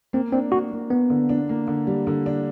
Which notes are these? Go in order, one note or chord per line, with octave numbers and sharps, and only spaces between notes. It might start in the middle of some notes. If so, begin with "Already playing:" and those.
A#3 C4
C4 D4
A#3 F#4
A#3
A#3 B3
D3
D4
A#3
D3
G3
D3
D4